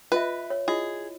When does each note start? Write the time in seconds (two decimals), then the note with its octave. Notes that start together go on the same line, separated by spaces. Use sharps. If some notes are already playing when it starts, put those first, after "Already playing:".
0.12 F4 B4 D#5 E5
0.50 C#5
0.68 E4 F4 G#4 D#5